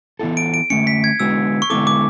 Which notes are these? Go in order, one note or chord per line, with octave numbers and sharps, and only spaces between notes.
E3 B3 E4 A4
D7
D7
D3 A3 C#4 C#7
B6
G#6
D3 G#3 B3 F#4 E6
C#6
D3 G#3 B3 E4 A4 D6
D6